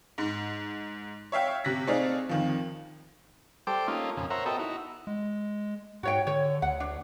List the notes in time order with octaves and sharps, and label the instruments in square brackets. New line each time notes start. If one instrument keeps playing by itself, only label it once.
[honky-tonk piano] G#2
C#5 E5 F5 G5
C3 F#6 A#6 B6
A3 C4 D#4 G#4 D5 F5
F2 D#3 F3
[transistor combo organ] G3 A4 C5 G5 D6
A3 A#3 C#4 D#4 F4
F2 A#2 C#3
A#4 C5 C#5 E5 F#5 A#5
B3 F#4 A4 D#5 E5 G5
D#4 E4 F#4
[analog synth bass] G#3
[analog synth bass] G#2 [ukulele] F#4 C#5 G5
[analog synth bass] D3 [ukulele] C#5
[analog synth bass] D2 [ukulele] F#5
[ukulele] D4